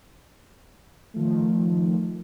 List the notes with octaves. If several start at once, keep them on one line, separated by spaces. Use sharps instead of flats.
D#3 F3 A3